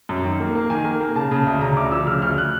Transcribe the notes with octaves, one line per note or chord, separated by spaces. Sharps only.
F#2
D#3
A#3
A#3
D#3 G#5
A#3
A#3
C#3 A5
C#3
D2
C#3 A#5
D2 D6
F3 E6
C#3 F6
D2 F6
F#6